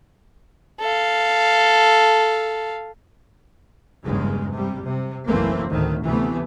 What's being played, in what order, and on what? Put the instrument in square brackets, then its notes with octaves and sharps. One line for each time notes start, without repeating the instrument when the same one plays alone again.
[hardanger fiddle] A4 F5
[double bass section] F#1 E2 G2 C#3 G#3
C3 G3
C3
F#1 B1 E3 A3 A#3 C4
D2 A2 D#3 A3
D2 C3 E3 A3 B3